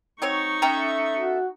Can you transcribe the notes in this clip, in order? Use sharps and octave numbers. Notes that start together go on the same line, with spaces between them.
F#3 C4 D#4 C#5 C#6
C#4 A4 E5 G5 A#5
F#4